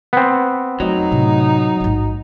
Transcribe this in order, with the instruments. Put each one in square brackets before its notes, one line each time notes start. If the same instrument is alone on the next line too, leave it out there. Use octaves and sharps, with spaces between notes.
[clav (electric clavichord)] B3 C4
[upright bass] F2 A3 [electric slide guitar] F#3 [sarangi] D#4
[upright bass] A2 C3
A1 G#2